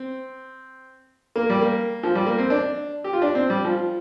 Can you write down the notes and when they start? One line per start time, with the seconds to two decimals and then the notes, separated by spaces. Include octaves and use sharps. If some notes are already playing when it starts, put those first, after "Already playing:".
Already playing: C4
1.36 A#3
1.50 G3
1.62 A#3
2.03 F3
2.15 G3
2.26 A#3
2.38 C4
2.50 D4
3.04 G4
3.13 F4
3.22 D4
3.35 C4
3.50 G3
3.65 F3